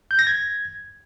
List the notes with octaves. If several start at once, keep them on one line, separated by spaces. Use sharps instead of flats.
G6
A#6
G#6